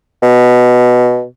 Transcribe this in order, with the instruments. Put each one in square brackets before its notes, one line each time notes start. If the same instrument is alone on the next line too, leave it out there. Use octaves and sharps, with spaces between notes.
[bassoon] B2